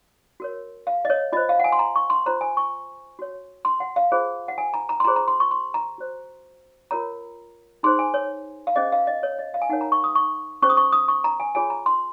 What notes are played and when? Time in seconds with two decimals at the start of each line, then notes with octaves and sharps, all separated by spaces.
0.40 F#4 A#4 C#5
0.87 F5
1.05 D#5
1.10 C#5
1.32 F4 D#5
1.37 C5
1.49 F5
1.59 F#5
1.64 G#5
1.72 C6
1.79 A#5
1.96 C#6
2.10 C6
2.26 F4 C5 A#5
2.41 G#5
2.57 C#6
3.19 F#4 C#5
3.65 C6
3.80 F#5
3.96 F5
4.12 F4 G#4 C5
4.48 F#5
4.58 G#5
4.74 A#5
4.89 A#5
5.00 C6
5.04 F4 G#4 C5 A#5
5.16 A#5
5.28 C6
5.40 C#6
5.51 C6
5.74 A#5
5.98 F#4 C5
6.91 F4 A#4 C#5 A#5
7.83 D#4 G#4 C5 C6
7.99 G#5
8.14 C#5
8.67 F5
8.76 C#4 G#4 C5 D#5
8.92 F5
9.07 D#5
9.23 C#5
9.39 D#5
9.54 F5
9.62 G#5
9.69 D#4 A#4 C#5 F#5
9.81 A#5
9.92 C#6
10.04 D#6
10.15 C#6
10.62 C#4 G#4 C5 C#6
10.69 D#6
10.77 C#6
10.92 D#6
11.08 C#6
11.24 A#5
11.40 G#5
11.55 F4 G#4 C#5 G#5
11.70 A#5
11.86 C6